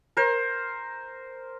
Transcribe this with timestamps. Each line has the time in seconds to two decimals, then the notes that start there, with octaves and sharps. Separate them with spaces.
0.17 A#4 C5